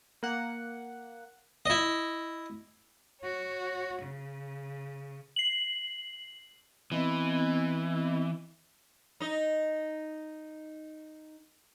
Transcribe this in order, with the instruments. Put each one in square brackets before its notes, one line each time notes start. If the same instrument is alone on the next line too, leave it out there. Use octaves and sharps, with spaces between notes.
[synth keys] A#3 F#5
[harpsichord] E4 D#5
[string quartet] F#4 C#5
C#3
[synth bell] C7 F#7
[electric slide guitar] E3 [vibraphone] B3 C4 D#5
[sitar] D#4 D#5